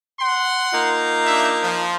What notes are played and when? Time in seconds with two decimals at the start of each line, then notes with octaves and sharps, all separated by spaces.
0.19 F#5 C6
0.73 A#3 D#4 F4
1.26 D4 E5
1.62 F3